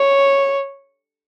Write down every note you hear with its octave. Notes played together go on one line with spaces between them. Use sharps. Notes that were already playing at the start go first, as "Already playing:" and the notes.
Already playing: C#5